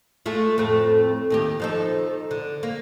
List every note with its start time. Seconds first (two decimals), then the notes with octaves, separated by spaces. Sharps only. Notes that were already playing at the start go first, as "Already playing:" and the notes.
0.26 G#3 A3 F4
0.58 F2 A2 A3
1.30 D#2 D#3 G4
1.60 F3 D#4 A4
2.31 D3
2.63 A#3